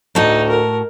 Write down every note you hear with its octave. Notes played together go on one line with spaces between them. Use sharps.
D2 A2 D#4 F#4 A5
A#4